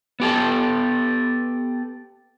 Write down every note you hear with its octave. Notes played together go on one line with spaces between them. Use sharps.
B3 G4 A4